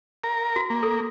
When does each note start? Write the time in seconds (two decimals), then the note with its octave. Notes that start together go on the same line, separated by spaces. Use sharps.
0.24 A#4
0.56 F#4
0.70 A#3
0.83 A4